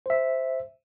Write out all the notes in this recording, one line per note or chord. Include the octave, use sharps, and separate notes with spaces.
C5 E5